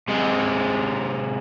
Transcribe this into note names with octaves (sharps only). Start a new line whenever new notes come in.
C3 G#3